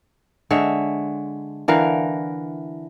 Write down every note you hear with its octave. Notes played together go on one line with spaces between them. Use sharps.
D3 G#3 C#5 E5
D3 E3 A#4 F5